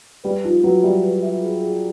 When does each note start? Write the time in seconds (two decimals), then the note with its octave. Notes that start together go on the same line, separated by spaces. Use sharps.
0.24 G3 B4
0.44 F3 D#4
0.63 F#3 B4
0.83 G3 E5
1.03 B4
1.23 E5
1.42 G#4
1.62 G#4